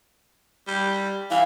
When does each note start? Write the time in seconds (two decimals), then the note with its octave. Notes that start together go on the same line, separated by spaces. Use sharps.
0.67 G3
1.31 E3 F5